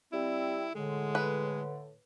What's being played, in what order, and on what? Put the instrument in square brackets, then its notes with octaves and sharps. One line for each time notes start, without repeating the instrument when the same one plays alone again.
[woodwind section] G3 C4 [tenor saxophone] E4
[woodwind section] A2 D3 [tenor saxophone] G#3
[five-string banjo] B4